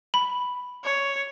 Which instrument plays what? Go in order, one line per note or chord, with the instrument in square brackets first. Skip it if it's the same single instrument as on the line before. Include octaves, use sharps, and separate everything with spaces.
[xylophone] B5
[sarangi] C#5